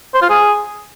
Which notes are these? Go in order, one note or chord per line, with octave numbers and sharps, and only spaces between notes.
C5
F4
G#4